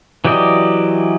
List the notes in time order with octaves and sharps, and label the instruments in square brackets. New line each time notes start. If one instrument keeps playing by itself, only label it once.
[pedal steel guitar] E3 F#3 G4 D5 D#5